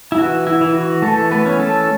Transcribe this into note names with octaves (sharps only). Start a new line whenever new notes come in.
E4
E3 F#4
E4
E3
F#4
E3 A3 A4
B3 B4
C#4
A3 A4